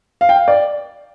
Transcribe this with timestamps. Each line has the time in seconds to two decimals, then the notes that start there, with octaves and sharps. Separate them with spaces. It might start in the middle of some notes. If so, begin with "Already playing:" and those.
0.21 F5
0.29 G5
0.36 F5
0.48 D5